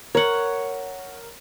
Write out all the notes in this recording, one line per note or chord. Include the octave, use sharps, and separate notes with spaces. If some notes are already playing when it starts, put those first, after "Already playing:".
A#4 C#5 F#5